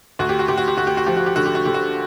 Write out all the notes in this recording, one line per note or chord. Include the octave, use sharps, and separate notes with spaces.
D2 F#4
G4
F#4
D2 G4
F#4
G4
D2 F#4
G4
F#4
F3 G4
F#4
G4
D3 F#4
G4
F#4
D3 G4
F#4